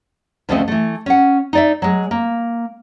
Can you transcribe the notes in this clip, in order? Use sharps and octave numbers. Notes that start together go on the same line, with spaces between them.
D2 C#3 F3 A3 C4 D#5
E3 A3
C#4 F#5
D#4 D5 E5
F#3 G#3
A#3